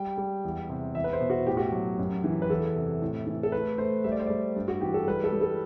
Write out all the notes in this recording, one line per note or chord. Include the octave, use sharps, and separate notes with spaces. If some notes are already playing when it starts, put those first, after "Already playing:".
Already playing: G3 G5
G3
E2
C3
E2 E5
B4
C5
B2
F#4
A2 G4
F#4
G4
F#3
F#2
E3
B4
E2 A4
C3
A2
E3
A4
A3 B4
A3 C5
G3 E5
D5
C5
G3 D5
G2
F#4
E3 G4
A4
G3 B4
A4
G3
A4